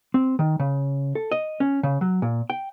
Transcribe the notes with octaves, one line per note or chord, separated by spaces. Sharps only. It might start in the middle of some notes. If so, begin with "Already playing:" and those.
C4
D#3
C#3
A4
D#5
C#4
C#3
F#3
A#2
G5